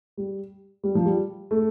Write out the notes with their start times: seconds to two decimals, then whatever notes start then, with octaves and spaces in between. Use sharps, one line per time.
0.17 G3
0.83 G3
0.95 F3
1.06 G3
1.51 A3